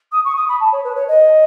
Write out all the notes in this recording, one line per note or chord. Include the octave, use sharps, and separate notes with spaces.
D#6
C#6
D#6
B5
A5
C#5
B4
C#5
D#5